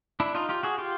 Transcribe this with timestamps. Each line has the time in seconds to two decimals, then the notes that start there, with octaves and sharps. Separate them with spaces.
0.20 D4 E4
0.35 D#4 F4
0.49 F4 G4
0.63 F#4 G#4
0.78 F4 G4